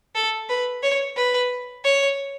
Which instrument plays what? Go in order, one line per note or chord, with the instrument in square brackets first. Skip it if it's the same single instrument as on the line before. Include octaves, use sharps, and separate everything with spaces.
[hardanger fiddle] A4
B4
C#5
B4
C#5